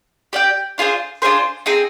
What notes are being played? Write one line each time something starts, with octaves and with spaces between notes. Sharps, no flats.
G4 D5 G5
D4 F4 G#4 C5
D4 F4 G#4 C5
C4 D#4 G#4